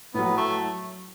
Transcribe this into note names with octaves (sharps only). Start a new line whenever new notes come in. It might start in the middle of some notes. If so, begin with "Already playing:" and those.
A2 F#3 B3
A3